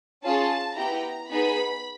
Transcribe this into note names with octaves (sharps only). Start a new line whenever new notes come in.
C#4 F4 G#4 A5
B3 E4 G4 A#5
B3 D#4 G#4 B5